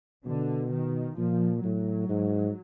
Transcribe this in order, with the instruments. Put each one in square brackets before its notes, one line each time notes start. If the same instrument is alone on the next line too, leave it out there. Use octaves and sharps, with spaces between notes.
[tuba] B2 [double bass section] D3
[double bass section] D#3
[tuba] A#2 [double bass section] F3
[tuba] A2 [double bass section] F#3
[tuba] G#2